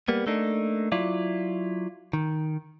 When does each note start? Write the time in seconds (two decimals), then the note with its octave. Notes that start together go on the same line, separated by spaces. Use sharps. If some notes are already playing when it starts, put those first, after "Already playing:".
0.08 G3 A#3 B3
0.27 A3 A#3 D4 D#4
0.92 F#3 E4 F4 D5
2.13 D#3